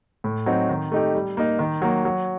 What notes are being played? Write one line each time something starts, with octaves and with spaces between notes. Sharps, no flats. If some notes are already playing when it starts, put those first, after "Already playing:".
A2
F#3 C4 D#4
D#3
A3 D#4 G4
G3
A#3 D#4
D#3
F#3 A#3
F#3